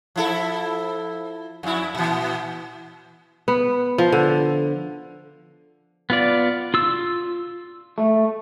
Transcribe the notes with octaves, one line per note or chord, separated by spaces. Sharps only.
F3 E4 A4
F2 E4
A#2 E3
B3
F3
D3
B3 F4 D5
F4 E6
A3